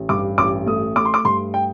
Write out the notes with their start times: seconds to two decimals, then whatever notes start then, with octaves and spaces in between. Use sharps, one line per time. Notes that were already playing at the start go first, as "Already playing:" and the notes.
Already playing: A1
0.09 G2 D6
0.38 A1 D6
0.66 A3 D#6
0.96 A3 D6
1.05 C6
1.14 D6
1.24 G2 C6
1.54 G5